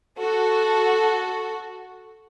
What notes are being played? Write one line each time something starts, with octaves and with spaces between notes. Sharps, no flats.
F#4 A4